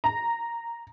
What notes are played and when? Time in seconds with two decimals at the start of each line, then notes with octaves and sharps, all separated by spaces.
0.04 A#5